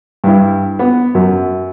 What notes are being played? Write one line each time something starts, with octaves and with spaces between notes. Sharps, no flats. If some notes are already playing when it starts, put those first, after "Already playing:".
G2 E4
B3
F#2